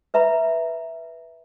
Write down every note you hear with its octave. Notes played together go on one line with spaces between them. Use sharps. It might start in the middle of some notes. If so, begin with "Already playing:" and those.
B4 E5 A#5 B5